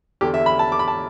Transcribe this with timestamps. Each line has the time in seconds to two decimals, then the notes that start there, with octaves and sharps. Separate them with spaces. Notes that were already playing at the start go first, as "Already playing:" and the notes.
0.21 E2 D3 G4
0.34 E5
0.46 B5
0.59 A5
0.72 D6
0.79 B5
0.88 A5